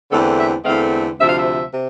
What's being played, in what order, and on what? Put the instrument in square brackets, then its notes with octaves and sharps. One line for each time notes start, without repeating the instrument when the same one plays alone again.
[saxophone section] E2 D3 A3 C4 A4
E5
E2 D3 A3 C4 F5
D2 C3 F3 E5
F5
E5
C3